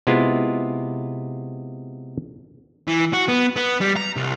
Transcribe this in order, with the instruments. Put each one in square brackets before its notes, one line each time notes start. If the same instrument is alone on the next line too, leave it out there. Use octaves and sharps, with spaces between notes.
[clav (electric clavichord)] C3 G#3 B3 E4 F4
[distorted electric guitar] E3
F#4
B3
B3
G3
A#5
C2